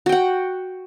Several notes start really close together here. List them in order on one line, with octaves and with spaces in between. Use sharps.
F#4 G5 F#5